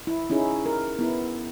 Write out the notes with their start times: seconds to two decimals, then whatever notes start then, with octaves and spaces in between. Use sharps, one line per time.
0.07 E4
0.30 C#4 D#4 E4 G#4
0.66 A#4
0.99 B3 E4